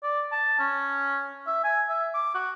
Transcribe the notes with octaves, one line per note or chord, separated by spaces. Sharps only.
D5
A5
C#4
E5
G#5
E5
D6
F#4